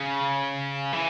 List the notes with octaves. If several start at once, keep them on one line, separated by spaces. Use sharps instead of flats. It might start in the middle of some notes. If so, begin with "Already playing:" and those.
Already playing: C#3
E3